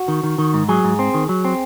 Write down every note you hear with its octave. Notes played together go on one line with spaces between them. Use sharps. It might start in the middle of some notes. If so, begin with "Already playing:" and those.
Already playing: F#4
D#3
D#3
D#3
G#2
F#3 G#4
G#2
C4
D#3
F#3
C4